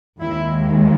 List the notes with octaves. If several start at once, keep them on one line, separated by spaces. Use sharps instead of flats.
D#2 D#3 G#3 E4